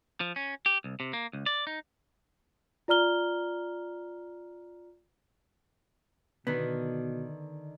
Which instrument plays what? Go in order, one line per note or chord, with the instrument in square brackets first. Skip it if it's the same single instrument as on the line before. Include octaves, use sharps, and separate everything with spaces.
[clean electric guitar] F3
C#4
G4
C2
C3
A#3
C#2
D5
D#4
[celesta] F4 D5 A#5 F6 G7
[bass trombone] B2 [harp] D3 D#3 [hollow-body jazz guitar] B3